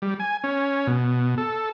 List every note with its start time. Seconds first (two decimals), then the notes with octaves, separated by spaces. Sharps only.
0.02 G3
0.20 G#5
0.44 C#4
0.87 B2
1.38 A4